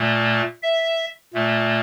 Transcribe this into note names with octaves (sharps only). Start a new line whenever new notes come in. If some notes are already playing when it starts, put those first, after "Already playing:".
Already playing: A#2 A3
E5
A#2 A3